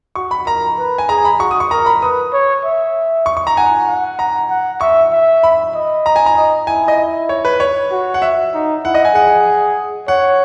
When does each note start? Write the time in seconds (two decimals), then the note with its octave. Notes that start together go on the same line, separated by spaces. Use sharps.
0.15 F#4 C#6
0.31 B5
0.47 A#4 A#5
0.78 B4
0.98 G#5
1.09 G#4 A#5
1.25 B5
1.39 F#4 C#6
1.51 D#6
1.60 C#6
1.71 A#4 A#5
1.86 B5
2.02 B4 D#6
2.33 C#5
2.65 E5
3.26 C#6
3.37 C#6
3.47 A#5
3.57 F#5 G#5
3.88 F#5
4.19 A#5
4.50 F#5
4.81 E5 C#6
5.13 E5
5.43 B5
5.74 D#5
6.06 A#5
6.16 G#5
6.26 A#5
6.36 D#5
6.67 E4 G#5
6.88 D#5
7.29 C#5
7.45 B4
7.60 C#5
7.92 F#4
8.14 F#5
8.22 E5
8.54 D#4
8.84 E4 F#5
8.94 D#5
9.05 G#5
9.15 G#4 F#5
10.08 C#5 F#5